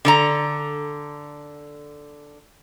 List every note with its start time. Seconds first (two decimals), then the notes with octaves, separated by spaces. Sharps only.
0.05 D3 A4 A#5